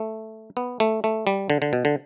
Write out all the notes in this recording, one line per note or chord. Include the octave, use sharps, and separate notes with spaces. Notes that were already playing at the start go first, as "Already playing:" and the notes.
Already playing: A3
B3
A3
A3
G3
D3
D3
B2
D3